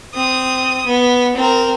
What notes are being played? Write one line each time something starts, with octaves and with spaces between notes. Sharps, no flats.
C4 D#6
B3
C4 A#4